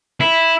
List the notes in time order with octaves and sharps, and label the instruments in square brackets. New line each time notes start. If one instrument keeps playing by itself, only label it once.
[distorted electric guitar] E4